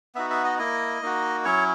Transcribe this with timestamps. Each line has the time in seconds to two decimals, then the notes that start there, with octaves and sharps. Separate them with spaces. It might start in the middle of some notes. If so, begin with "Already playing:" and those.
0.15 B3 D#4 F#4 E5
0.30 E5
0.44 D#5
0.58 A#3 E4 D#5
1.02 A#3 D#4 F#4
1.44 F#3 C#4 E4 C#5